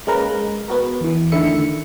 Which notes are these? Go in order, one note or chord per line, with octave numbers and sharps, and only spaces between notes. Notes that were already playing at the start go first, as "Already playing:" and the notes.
G#3 A#3 C#4 A#4 B4 A#5
G#3
B3 F#4 A#4
E2 E3
D3 D#3 A3 E4 E5 C#7